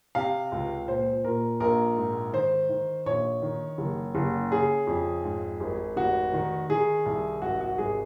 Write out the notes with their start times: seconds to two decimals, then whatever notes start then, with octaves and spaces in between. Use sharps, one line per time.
0.15 C3 F5
0.52 C#2
0.88 A#2 C5
1.24 A#2 A#4
1.60 A#1 A#4
1.97 G#2
2.33 D#3 C5
2.69 D#3
3.06 A#1 C#5
3.42 D#3
3.78 F#1
4.15 F#1
4.52 C#3 G#4
4.87 F2
5.24 G#2
5.60 G#1
5.97 F1 F#4
6.33 D#3
6.69 D#3 G#4
7.06 C2
7.42 G#1 F#4
7.61 F#4
7.78 G#1 G#4